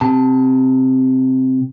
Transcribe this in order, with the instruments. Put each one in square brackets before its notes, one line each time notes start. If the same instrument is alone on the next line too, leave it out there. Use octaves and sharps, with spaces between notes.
[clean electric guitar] C3 A5